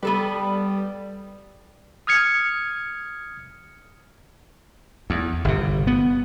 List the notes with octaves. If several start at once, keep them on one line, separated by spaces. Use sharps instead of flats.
G3 B3 A4 B4
D#6 F6 G#6 C#7
E2
G1 C3
B3